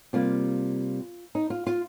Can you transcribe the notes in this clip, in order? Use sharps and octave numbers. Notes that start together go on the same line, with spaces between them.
C3 G3 A#3 F4
D#4
F4
F4